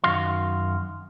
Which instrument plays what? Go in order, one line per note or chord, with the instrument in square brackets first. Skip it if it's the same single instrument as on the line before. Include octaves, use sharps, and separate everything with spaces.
[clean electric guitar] F#2 D#3 F#4 F5 C6